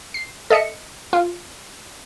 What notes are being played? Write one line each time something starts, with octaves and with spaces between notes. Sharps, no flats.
C7
A4 D#5 E5 C#7
F4